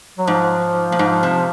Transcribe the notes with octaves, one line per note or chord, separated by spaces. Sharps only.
F#3
G#2 F3
A#2
G#2
C3